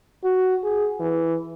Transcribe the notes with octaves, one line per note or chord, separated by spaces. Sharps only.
F#4
G#4
E3